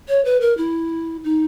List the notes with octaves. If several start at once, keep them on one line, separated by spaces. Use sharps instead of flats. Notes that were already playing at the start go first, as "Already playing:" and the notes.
C#5
B4
A#4
E4
D#4